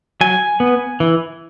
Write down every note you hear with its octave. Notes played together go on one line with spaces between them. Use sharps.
F#3 G#5
B3
E3